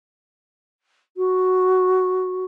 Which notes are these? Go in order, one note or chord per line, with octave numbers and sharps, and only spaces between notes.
F#4